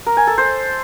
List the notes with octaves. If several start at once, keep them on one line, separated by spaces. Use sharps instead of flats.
A#4
G#5
A4
C5